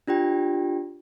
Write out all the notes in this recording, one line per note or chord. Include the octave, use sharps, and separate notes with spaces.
D4 F4 G4 G5